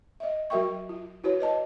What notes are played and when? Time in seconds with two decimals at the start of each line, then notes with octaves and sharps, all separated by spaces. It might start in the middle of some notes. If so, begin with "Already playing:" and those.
0.20 D#5 E5
0.50 F#3 F#4 A#4 E5 G5 C#6
0.89 F4
1.24 E4 F#4 B4 C#5
1.41 B4 D#5 A5